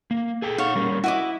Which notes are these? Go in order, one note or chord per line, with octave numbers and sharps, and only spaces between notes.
A#3
G#4 A4 G5
D#4 C#5 F5 F#5
G3 A#3 C#4
E4 F#4 D#5 D6